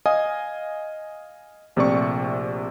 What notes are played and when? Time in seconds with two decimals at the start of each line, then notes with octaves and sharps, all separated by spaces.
0.06 D#5 F5 G#5 D#6
1.76 A#1 C3 A3 D5 C#6